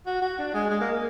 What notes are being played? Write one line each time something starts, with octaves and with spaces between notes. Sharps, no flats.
F#4
F#4
D4
G#3
G#3
A#3